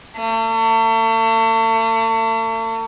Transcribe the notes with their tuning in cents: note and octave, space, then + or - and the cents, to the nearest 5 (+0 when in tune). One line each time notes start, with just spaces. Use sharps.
A3 +40